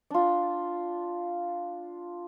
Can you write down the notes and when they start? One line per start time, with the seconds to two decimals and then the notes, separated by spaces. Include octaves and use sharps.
0.11 D4 F4